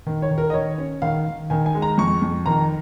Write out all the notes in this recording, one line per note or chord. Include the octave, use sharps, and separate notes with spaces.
D#3
C#5
D#3
A#4
D#5
D#3 C#5
C#4
D#3 F5
D#3
D#3 G#5
G#5
G#3
A#5
F2 C#6
F2
D#3 A#5